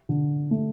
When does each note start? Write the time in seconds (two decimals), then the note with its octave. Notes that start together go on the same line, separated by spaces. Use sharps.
0.09 D3
0.51 A3